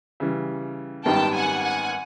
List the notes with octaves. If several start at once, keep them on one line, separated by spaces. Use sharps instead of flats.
C#3 E3 G3
G#1 F#2 D#3 G3 B3 G5 A5
F#5 G#5
F#5 G#5